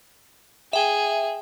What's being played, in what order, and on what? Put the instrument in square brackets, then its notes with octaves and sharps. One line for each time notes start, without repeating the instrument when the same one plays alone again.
[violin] G#4 [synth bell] E5 G5